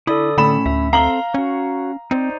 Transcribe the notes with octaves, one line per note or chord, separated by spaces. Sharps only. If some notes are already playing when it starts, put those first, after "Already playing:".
D3 E4 A4 D5 B5 D#6
A2 D3 C#4 B5 E7
D2 E5
C4 A4 F5 A#5 F#7 G7
C#4 F#4 C#5
C4 D#4 C5 D5